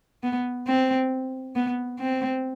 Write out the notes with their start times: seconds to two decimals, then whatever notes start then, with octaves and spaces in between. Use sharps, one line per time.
0.23 B3
0.67 C4
1.56 B3
2.00 C4